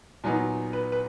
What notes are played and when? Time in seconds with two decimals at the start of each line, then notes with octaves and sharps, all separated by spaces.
0.24 A#2 F#3 B3 D#4 G#5
0.73 B4
0.92 B4